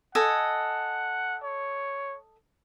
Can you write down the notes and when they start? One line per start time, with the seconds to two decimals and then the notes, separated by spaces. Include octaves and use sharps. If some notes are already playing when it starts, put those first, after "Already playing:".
0.15 A4 D#5 F#5 G#5
1.43 C#5